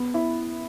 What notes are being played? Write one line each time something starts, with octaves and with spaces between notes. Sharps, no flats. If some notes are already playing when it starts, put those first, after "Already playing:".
Already playing: B3
E4